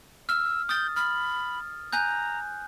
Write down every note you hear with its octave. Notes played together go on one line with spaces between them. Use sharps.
E6 F6
D#6 G6 A6
B5 F6
G#5 A#5 F#6 G6